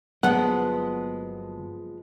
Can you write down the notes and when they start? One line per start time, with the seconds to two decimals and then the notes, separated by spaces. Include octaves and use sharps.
0.23 G1 F3 F#3 G#3 A#3 B3 F#5